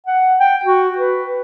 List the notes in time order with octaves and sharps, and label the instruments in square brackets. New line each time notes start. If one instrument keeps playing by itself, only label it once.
[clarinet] F#5
G5
F#4
B4